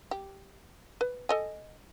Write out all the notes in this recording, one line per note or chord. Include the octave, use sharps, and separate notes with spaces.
G4
B4
A4 D#5 G#5